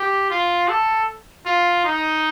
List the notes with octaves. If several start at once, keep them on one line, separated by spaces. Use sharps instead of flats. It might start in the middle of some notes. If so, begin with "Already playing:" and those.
Already playing: G4
F4
A4
F4
D#4